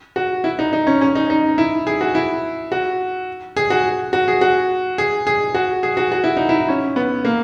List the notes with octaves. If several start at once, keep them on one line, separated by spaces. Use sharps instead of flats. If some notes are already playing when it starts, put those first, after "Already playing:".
F#4
E4
D#4
D#4
C#4
C#4
D#4
D#4
E4
G#4
F#4
E4
F#4
G#4
F#4
F#4
G#4
F#4
G#4
G#4
F#4
G#4
F#4
F#4
E4
D#4
E4
C#4
B3
A#3